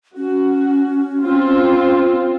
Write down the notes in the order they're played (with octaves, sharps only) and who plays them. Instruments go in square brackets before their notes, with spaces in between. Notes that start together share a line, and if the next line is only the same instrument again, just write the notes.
[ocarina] C#4 [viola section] F#4
[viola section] C4 F4